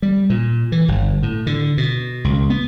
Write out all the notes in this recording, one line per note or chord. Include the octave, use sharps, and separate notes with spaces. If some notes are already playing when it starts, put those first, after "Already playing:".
G3
A#2
E3
G1
A2
D3
B2
C#2
B3